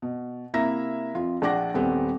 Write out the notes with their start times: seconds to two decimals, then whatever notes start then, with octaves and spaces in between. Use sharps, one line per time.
0.02 B2
0.54 C3 A#3 E4 E5 A#5 A#6
1.14 F2 F4
1.42 A#1 D4 F#5 D6 A#6
1.74 D#1 G3 B3 C4